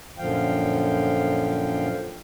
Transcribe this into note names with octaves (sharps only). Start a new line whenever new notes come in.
F#2 A#2 D3 F3 F5 G5